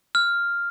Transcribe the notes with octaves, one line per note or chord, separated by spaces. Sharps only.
F6